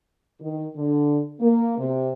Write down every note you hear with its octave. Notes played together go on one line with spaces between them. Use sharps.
D#3
D3
A#3
C3